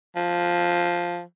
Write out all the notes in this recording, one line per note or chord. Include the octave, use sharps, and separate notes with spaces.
F3